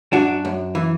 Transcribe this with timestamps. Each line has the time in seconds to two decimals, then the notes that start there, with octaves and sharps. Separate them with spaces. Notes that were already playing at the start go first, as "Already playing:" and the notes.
0.12 F#2 D4 F#4
0.45 F#2
0.75 E3